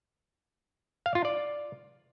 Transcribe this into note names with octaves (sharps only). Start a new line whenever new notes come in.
F5
F4
D5